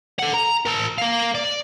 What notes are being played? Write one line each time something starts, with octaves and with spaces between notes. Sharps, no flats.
A4 F#5
A#5
A#4 A5
A#4 F5
D5